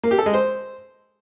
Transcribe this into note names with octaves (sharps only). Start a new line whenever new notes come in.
A#3
G4
A4
G#3
C5